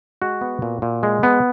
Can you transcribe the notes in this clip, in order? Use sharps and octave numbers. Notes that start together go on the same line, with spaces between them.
G#3 F#4
B3
A#2
A#2
G#3
B3